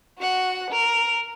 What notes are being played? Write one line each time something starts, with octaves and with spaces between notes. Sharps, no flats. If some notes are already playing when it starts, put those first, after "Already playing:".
F#4 F#5
A#4